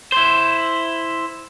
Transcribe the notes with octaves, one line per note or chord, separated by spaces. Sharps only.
E4 C5